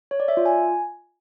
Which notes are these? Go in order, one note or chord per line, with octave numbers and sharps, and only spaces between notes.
C#5
D5
E5
F4
G#5